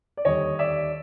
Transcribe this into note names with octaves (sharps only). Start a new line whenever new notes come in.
D5
D#2 D3 G3 C#5 D#5
D5 E5